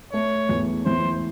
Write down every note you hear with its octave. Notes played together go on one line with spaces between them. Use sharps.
A3 C#5
E2
E3 C5